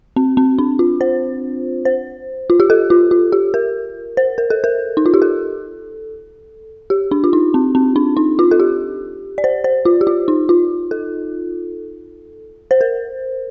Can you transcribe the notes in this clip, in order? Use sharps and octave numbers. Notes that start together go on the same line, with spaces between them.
C4
C4
D4
F4
C5
C5
F4
G4
A4
F4
F4
G4
A#4
C5
A#4
A4
A#4
D#4
F4
G4
A4
G4
D4
F4
D#4
C4
C4
D4
D#4
F4
A4
G4
D5
C5
C5
F4
G4
F4
D#4
F4
A4
C5
A#4